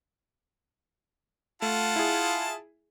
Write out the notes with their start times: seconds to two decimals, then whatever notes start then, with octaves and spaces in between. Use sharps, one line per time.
1.62 A3 F4 F#5 A5
1.96 E4 G#4